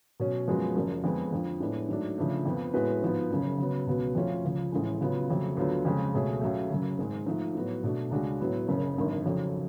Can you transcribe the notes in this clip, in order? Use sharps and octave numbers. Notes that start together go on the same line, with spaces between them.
B2 F#3 C#4
F#2 F3 G#3 B3 F#4
F#1 F#2 F3
F2 D3 G#3 B3 D4
F2 D3 F3
A2 G#3 B3 D4
G#2 F#3 A3 D4
C#3 F3 A3 D4
F2 F3 B3
A2 G#3 B3 F#4 B4
G#2 F3 B3
F#1 F#2 C#3
C#3 F#3 B3
C#2 B2 F#3 B3 F#4
F2 F3 A3 C#4 F4
C#2 C#3 F3
A1 A2 G#3
C#3 F#3 B3 F4
F2 C#3 F#3 A3
D2 D3 F#3 B3 F4
F2 C#3 G#3
C#2 B2 A3 C#4 G#4
C#2 C#3 F#3 A3
F#1 F#2 C#3 F#3
G#1 G#2 G#3
G#2 F3 A3
A2 F#3 B3 F#4
B2 A3 D4 F#4
C#2 C#3 G#3 D4 F#4
A2 F#3 B3
F#1 F#2 C#3
G#1 F#2 D3
F1 F2 C#3 F#3